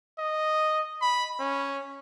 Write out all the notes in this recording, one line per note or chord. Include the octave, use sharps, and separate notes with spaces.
D#5
B5
C#4